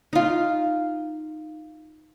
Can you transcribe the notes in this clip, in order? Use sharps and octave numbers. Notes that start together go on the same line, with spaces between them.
D#4 F4